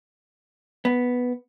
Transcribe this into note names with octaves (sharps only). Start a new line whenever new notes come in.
B3